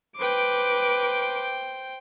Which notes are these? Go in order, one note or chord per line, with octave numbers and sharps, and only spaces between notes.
B4 C5 G5 D6